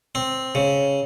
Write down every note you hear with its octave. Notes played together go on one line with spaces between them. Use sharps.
C4
C#3